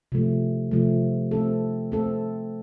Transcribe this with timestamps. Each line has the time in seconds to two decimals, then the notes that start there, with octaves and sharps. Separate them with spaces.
0.12 C3 F3 A3
0.71 C3 F3 A3
1.31 A3 C4 A4
1.92 A3 C4 A4